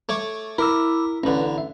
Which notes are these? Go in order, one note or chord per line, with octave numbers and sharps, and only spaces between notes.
A3 C#5 D6
E4 A#4 B5 D6 E6
A1 D3 C#4 A4 B4
E5